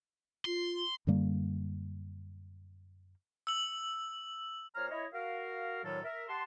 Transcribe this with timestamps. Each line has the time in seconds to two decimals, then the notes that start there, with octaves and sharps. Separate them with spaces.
0.45 F4 C6
1.07 F#2 D3 G3 A#3
3.47 E6 F#7
4.75 A#2 C5 C#5 A#5 F6
4.89 E4 C#5 D#5
5.13 F#4 A#4 F5
5.83 D2 A2 D#3 F#3 A4 C#5
6.04 A#4 E5
6.28 G4 F#5 A5 C6